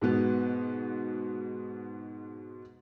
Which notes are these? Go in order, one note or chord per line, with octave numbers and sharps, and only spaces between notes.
G#2 B2 B3